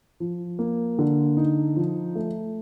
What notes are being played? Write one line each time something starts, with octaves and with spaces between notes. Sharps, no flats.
F3
A#3
D3
D#4
F3
A3